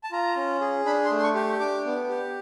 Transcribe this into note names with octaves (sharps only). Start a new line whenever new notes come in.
A5
F4 A#5
C#4
G#4
D4 B5
C6
A3
C6
C#6
G4
D4 D6
B3
G4